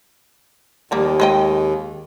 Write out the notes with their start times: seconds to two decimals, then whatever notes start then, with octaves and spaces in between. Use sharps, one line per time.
0.91 D#2 F3 G3 A#3
1.20 G#3 D#5 G5